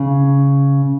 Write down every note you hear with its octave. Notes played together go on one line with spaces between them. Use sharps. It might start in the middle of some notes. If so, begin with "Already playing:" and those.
Already playing: C#3